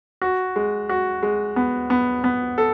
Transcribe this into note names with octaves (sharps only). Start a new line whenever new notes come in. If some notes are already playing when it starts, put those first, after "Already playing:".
F#4
G#3
F#4
G#3
B3
B3
B3
A4